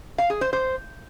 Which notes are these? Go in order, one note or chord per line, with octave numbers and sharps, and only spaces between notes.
F5
G#4
C5
C5